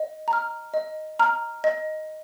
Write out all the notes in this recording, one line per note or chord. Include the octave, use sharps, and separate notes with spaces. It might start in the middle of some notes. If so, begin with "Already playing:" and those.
Already playing: D#5
A#5
F6
D#5
A#5 F6
D#5